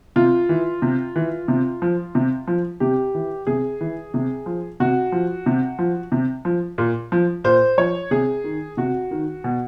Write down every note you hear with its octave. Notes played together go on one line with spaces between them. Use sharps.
C3 F4
E3
C3
E3
C3
F3
C3
F3
C3 G4
E3
C3 G#4
E3
C3
F3
C3 F#4
F3
C3
F3
C3
F3
A#2
F3
A#2 C5
F3 C#5
C3 G#4
D#3
C3 F#4
D#3
B2